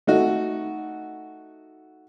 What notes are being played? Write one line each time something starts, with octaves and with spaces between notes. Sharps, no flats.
A3 D#4 F#4